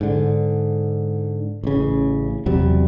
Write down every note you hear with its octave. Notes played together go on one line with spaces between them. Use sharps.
G#2 D3
A1 C#3
E2 C3 F#3 G3